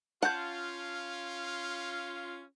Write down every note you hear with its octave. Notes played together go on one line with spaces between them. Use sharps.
C#4 F4 F#5 A5 G6